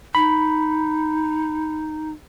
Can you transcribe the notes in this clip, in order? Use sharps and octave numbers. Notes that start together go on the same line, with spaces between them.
D#4 B5